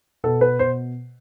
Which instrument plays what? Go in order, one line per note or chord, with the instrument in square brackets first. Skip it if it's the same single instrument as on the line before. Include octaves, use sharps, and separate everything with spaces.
[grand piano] B2 A4
B4
B2 C5